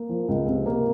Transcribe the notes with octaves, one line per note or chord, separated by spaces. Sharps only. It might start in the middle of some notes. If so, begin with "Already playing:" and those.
Already playing: A#3
F3
C#2
C3
A#3